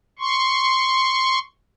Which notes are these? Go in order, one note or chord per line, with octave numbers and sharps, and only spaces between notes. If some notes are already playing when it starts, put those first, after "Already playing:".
C6 C#6